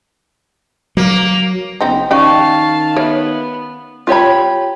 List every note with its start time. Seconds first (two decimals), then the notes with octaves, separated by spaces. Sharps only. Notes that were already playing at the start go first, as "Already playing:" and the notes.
0.97 F#3 A#3
1.81 F#1 B3 C4 D#4
2.11 D#3 C#4 D#4 D5 F5 G5 A5 C#6
2.96 B3 A#4 C#5 E5
4.07 F4 G4 C#5 B5